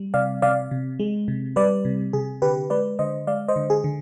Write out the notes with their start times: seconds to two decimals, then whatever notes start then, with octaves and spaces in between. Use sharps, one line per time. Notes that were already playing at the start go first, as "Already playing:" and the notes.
Already playing: G3
0.14 C3 D5 F5
0.42 C3 D5 F5
0.71 C3
0.99 G#3
1.28 C3
1.56 G3 B4 D5
1.85 C3
2.13 C3 G#4
2.42 D3 G4 B4
2.70 G#3 B4 D5
2.99 D3 C5 D#5
3.27 G#3 D5 F5
3.48 C5 D#5
3.56 D3
3.70 G#4
3.84 D3